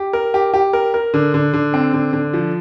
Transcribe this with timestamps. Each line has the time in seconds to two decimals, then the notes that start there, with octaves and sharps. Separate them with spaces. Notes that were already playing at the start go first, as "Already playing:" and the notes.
Already playing: G4
0.13 A#4
0.34 G4
0.54 G4
0.73 A#4
0.94 A#4
1.14 D3
1.34 D3
1.53 D3
1.74 C4
1.93 D3
2.13 D3
2.33 F3